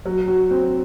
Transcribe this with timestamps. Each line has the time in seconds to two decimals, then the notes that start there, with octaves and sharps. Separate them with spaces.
0.06 F#3
0.28 F#4
0.51 C4